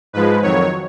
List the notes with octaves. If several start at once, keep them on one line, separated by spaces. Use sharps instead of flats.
G#2 F3 G#3 B4
F2 D#3 F#3 C#5